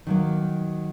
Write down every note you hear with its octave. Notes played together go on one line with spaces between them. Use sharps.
D#3 F#3 A#3